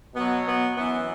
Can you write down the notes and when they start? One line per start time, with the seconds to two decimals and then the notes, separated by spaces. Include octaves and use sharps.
0.15 B2 F#3 B3
0.46 B3
0.77 F#2 E3 B3